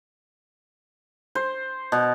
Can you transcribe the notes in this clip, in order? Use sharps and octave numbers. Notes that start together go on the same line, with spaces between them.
C5
B2